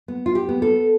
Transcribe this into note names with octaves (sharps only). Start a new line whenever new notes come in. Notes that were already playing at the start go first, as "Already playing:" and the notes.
B3
F4
G4
B3
A4